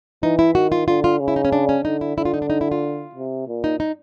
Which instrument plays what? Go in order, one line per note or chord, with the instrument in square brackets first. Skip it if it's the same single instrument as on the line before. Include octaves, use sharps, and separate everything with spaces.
[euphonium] E3 [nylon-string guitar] D#4
[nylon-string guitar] E4
[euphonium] D#3 [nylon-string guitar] F#4
[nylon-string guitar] F4
[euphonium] D3 [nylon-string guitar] F4
[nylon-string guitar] F4
[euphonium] C#3
[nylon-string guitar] E4
D#4
C#4
D4
C#4
[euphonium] D3 [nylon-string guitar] D#4
[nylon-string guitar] E4
[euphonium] D3 [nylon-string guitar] E4
[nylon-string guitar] F4
D#4
D4
D#4
E4
F4
[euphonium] C3
A#2
[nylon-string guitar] D#4
D#4